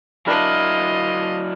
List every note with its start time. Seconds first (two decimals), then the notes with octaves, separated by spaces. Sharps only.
0.26 F#3 D4 E4 F4 A#4 D#5 B5